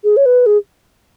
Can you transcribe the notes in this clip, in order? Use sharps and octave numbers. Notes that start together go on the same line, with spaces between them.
G#4
C#5
B4
G#4